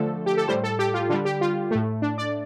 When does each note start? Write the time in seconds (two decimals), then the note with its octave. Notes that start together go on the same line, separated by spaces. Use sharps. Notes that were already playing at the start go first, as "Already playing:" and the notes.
Already playing: D3 F3 A3 A4
0.26 G4
0.37 A4
0.48 A2 G3 C5
0.63 A4
0.79 G4
0.94 F4
1.10 D3 F4
1.13 G3
1.25 G4
1.41 F4
1.71 A2 A3
2.02 D4
2.18 D5